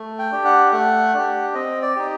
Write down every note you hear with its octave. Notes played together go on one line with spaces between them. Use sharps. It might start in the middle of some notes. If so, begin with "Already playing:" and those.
Already playing: A3
G5
D4 G4
F#5
A3 F#5
D4 G4
C4 D#5
D5
D#4 G4